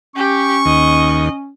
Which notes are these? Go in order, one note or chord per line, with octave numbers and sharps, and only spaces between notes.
C#4 G4 C#6
D#2 D#5